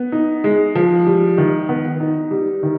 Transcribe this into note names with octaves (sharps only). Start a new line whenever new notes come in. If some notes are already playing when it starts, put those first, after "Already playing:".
Already playing: B3
D#4
G#3
F3
G3
D#3
B3
D#4
G3
D#3